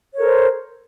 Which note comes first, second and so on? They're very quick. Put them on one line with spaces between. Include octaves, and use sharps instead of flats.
C#5 A#4 A4 C5